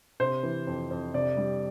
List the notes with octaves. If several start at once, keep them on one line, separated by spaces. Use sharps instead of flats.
C3 C5
E3
F2
F2
C3 D5
G3